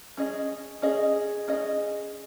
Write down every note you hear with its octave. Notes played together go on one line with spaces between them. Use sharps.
C#4 G#4 D#5
C#4 G#4 D#5
C#4 G#4 D#5